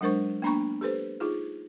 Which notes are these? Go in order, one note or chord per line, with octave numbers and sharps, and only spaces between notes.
F#3 G#3 D4 A#4 C5 C#6
A#3 B3 D4 A#5 B5 C#6
G4 A4 B4 C5
D#4 F4 G#4